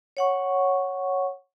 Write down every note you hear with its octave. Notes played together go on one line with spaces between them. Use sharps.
C#5 F#5 C#6